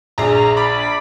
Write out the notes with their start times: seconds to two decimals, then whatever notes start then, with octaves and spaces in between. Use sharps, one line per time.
0.18 A#1 D4 G#4 A#5
0.57 D5 B5